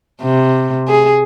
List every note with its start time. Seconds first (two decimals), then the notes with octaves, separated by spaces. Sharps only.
0.22 C3
0.88 G#4